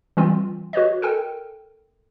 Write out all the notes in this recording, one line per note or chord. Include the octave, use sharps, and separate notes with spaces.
E3 G3 C4 F4
F#4 B4 C#5 D#5
A4 A#4 G5